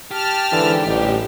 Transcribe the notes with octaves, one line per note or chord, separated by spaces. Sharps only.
G4 A5 F6
G#2 D3 E3
A1 A2 D3 G3 D#4